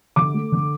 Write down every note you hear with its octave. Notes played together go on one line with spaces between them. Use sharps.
D3 D6
A3
D3